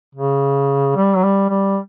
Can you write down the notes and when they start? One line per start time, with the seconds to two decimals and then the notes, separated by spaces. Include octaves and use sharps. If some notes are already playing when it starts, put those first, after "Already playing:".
0.15 C#3
0.96 G3
1.16 F#3
1.24 G3
1.50 G3